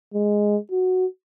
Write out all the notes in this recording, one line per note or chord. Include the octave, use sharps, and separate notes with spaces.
G#3
F#4